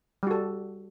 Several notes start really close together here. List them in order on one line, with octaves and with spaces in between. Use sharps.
G3 F#4 A4